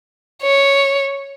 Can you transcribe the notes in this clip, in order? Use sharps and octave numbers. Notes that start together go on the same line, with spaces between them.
C#5